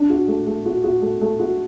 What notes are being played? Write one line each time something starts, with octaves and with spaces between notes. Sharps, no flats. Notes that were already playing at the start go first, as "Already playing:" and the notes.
Already playing: D4
F#4
A3
A3
F#4
F#4
A3
A3
F#4